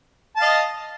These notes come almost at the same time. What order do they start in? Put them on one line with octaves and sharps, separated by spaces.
A5 F5 D#5